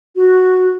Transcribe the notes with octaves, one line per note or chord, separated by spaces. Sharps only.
F#4